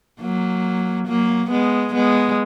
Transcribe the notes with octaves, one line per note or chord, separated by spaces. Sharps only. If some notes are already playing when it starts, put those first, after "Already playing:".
F#3 A#3
F#3 A#3
G#3 B3
G#3 B3